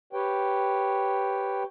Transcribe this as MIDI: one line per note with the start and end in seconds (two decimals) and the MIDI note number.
0.13 1.63 67
0.13 1.63 71
0.13 1.63 73
0.13 1.63 79